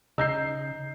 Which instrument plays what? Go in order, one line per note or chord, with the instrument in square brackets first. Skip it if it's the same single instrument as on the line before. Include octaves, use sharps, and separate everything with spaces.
[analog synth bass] C#3 [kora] D#4 [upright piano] E6 G6 C7